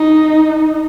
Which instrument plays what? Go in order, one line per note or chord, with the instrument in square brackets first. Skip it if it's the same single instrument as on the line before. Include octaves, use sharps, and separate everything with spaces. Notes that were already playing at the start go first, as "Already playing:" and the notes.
Already playing: [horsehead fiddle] D#4